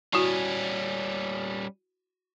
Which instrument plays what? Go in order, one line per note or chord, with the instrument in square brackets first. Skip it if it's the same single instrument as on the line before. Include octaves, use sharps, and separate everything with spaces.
[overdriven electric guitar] G3 C#4 [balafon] E4 F#4